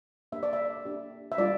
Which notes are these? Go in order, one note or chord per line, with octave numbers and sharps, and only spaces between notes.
A#3 D4 G4 E5
D5
E5
A#3 D4 G4
E5
G3 D4 F4 D5